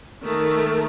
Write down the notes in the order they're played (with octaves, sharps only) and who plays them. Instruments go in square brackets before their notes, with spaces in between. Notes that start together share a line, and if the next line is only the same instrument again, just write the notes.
[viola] D#3 A3